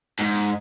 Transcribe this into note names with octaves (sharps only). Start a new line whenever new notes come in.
G#2